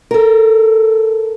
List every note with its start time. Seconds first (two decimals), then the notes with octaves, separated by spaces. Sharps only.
0.11 A4 A#4